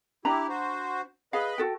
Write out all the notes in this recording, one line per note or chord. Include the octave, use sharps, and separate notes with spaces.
D4 E4 G4 A#5 B5
F#4 C5
G#4 B4 D#5 F5 B5
F#4 A4 G5